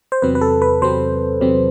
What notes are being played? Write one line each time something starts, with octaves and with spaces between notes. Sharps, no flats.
C5
E2 C3 F#3 C4 B4
B4
A4
B4
E2 C3 F#3 C4 C5
E2 C3 F#3 C4